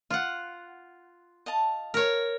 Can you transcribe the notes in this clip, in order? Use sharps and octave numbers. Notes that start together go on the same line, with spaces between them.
F4 F#5
D#5 F5 A5
A#4 C#5